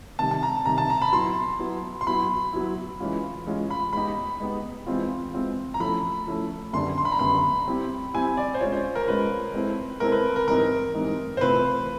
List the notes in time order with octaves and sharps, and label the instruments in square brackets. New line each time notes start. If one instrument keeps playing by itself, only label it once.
[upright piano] C3 D#3 G3 [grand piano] A5
[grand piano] A5
A#5
[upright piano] C3 D#3 G3 [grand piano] A#5
[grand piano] A5
A#5
B5
[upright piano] F#3 B3 E4 [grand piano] C6
[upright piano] F#3 B3 E4
[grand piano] C6
[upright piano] F#3 B3 E4 [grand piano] B5
[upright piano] F#3 B3 E4
E3 G#3 C#4 F4
E3 G#3 C#4 F4
[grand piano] B5
[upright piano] G#3 B3 D#4 G4 [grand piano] B5
[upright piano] G#3 B3 D#4 G4
E3 G#3 C4 F4
E3 G#3 C4 F4
[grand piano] A#5
[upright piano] F3 A3 C#4 E4 A4 [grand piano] B5
[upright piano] F3 A3 C#4 E4 A4
[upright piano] F#2 D3 G3 B3 D4 [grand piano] C6
[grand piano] C6
B5
A#5
[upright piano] F#2 D3 G3 B3 D4 [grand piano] B5
[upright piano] G3 C4 E4 G4
[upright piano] G3 C4 E4 G4 [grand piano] G#5
[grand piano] D5
C5
[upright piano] G#3 C#4 F4 [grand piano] C#5
[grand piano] C5
A#4
[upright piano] G#3 C#4 F4 [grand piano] B4
[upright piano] G#3 C4 E4 A4 C5
[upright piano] G#3 C4 E4 A4 C5 [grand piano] A#4
[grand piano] B4
A#4
[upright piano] G#2 E3 G3 C4 D#4 [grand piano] A#4
[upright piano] G#2 E3 G3 C4 D#4
[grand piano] C5
[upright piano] C3 E3 A3 C4 F4 [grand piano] B4